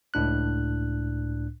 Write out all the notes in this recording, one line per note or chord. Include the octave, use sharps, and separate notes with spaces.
C#2 A2 D4 F#6